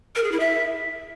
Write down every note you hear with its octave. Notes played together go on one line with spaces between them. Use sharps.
A#4
G#4
E4
E5